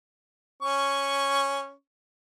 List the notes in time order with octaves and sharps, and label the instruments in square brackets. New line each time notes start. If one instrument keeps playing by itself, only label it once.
[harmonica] C#4 C#6